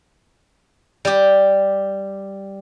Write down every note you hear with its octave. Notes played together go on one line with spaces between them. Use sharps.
G3 G4